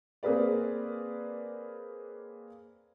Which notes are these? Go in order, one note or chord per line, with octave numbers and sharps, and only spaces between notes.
A#3 C4 G#4 A#4 B4 D5